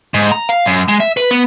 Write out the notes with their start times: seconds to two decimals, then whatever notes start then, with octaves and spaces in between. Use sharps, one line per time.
0.14 G#2
0.32 A#5
0.49 F5
0.65 F#2
0.88 G#3
1.00 E5
1.17 B4
1.31 B3